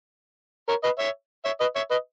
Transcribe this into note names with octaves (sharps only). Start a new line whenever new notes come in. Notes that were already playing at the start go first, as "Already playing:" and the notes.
A#4 C#5
B4 D#5
C#5 E5
C#5 E5
B4 D#5
C#5 E5
B4 D#5